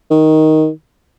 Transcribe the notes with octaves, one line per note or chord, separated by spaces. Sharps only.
D#3